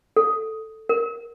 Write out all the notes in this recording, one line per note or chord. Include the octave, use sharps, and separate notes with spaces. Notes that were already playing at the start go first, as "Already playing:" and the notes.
A4
A#4